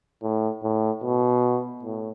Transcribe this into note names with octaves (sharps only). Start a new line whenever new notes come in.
A2
A2
B2
A2